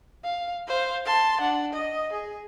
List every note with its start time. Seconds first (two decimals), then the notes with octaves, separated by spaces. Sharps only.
0.24 F5
0.68 C5 F5
1.05 A5 C6
1.41 D4 F#5
1.73 D#5
2.13 G#4